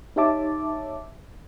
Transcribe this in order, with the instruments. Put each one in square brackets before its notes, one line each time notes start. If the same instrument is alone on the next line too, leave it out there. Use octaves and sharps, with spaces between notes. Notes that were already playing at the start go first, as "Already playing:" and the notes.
[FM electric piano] D#4 G4 C#5 E5 A5 D6